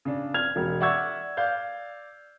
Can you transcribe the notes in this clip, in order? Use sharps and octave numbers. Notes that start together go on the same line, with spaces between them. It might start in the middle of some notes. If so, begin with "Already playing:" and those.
C#3 D4
F6 G#6 F7
E1
D5 E5 F#5 C#6 E6 G#6
D5 F5 G6